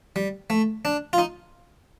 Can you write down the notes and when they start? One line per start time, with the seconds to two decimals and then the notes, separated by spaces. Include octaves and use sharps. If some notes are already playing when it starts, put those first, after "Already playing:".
0.16 G3
0.50 A3
0.85 D4
1.13 F4
1.18 D#4